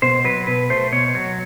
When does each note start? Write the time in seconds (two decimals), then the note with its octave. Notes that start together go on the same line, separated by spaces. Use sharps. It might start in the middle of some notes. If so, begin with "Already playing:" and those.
0.02 B2 C5
0.25 F#3 B4
0.47 B2 B4
0.70 A3 C5
0.92 B2 C#5
1.15 F#3 C#5